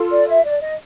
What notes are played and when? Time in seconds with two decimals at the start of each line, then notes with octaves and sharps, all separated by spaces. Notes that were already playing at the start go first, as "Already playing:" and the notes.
Already playing: F4 A4
0.10 D5
0.27 E5
0.44 D5
0.61 D#5